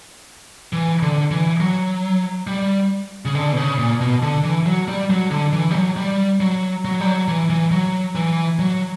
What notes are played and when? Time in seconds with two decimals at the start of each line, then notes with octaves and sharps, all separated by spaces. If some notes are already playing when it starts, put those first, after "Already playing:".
0.73 E3
1.02 D3
1.31 E3
1.60 F#3
2.47 G3
3.25 C#3
3.35 D3
3.53 B2
3.57 C#3
3.78 A#2
4.00 B2
4.22 D3
4.44 E3
4.66 F#3
4.88 G3
5.10 F#3
5.31 D3
5.53 E3
5.71 G3
5.75 F#3
5.97 G3
6.40 F#3
6.85 F#3
7.00 G3
7.06 F#3
7.28 E3
7.50 E3
7.71 F#3
8.15 E3
8.59 F#3